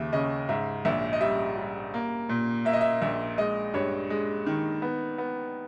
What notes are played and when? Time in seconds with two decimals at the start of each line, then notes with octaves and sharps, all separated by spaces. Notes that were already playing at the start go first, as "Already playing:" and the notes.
Already playing: D#2 C#3 E5
0.12 C#3 D#5
0.49 G#2 E5
0.85 A#1 E5
1.13 D#5
1.21 G3 E5
1.57 G3
1.94 A#3
2.29 A#2
2.65 A#3 E5
2.73 D#5
2.81 E5
3.02 A#1 E5
3.38 G#3 D#5
3.74 G2 C#5
4.10 G#3
4.46 D#3
4.82 B3
5.18 B3